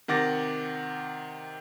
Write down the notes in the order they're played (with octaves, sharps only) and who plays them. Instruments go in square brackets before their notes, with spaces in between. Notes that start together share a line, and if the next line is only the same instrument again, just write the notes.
[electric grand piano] C3 D#3 F#5 D6 A6 A#6